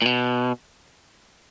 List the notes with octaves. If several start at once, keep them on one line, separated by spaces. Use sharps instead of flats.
A#2
B2